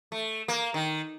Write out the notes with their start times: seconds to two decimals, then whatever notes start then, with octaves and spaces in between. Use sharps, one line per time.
0.12 A3
0.48 A#3
0.74 D#3